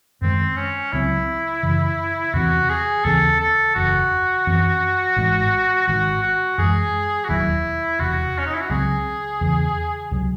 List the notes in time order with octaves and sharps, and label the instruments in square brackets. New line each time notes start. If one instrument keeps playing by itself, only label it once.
[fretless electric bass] F#2 D#3 G#3 [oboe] C4
[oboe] C#4
[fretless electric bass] C#2 C#3 F#3 C4 [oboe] E4
[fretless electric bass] F#2 C#3 E3
[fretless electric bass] E2 C3 E3 C4 [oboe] F#4
[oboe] G#4
[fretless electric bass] D#2 C#3 E3 C4 [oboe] A4
[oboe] A4
[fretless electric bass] F#1 E2 C#3 [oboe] F#4
[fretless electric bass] F#2 E3 C4
G#1 G#2 E3 G#3
[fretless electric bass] G#1 G#2 D#3 G#3 [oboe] F#4
[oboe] F#4
[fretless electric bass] F#2 E3 G#3 [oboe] G#4
[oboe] F#4
[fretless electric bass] E1 D#2 D#3 F#3 [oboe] E4
[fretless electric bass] E1 E2 C3 [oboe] F#4
[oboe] C#4
D#4
E4
F#4
[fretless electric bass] C#2 C#3 F#3 C4 [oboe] G#4
[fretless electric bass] E2 C#3 E3
C#2 C3 F#3